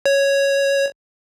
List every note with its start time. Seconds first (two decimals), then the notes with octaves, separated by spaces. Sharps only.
0.06 C#5